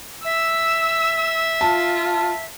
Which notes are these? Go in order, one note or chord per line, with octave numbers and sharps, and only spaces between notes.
E5 E6
F4 A5